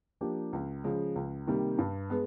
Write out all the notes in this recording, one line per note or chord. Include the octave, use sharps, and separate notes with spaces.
F3 A#3 D4 G4
C#2
C#3 F3 G#3
C#2
C3 D#3 G3 A#3
G2
G#3 B3